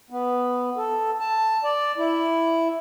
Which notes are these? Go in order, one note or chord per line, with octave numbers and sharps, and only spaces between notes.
B3
A4
A5
D5
E4